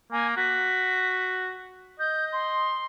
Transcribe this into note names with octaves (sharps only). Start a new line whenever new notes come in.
A#3 G#5
F#4 B6
D#5 G6
C6